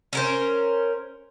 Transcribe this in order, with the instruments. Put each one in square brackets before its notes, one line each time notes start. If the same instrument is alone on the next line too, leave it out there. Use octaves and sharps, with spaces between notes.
[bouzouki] C#4 A#4 C5